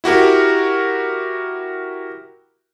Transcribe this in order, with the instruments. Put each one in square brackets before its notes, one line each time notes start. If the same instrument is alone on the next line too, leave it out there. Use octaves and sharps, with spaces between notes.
[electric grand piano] E4 F#4 G4 A#4